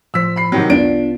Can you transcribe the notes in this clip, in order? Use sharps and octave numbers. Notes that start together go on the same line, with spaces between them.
A2 F3 C5 E6 B6
B5 C7
C3 D#3 F#3
C2 B3 D4 F4 D7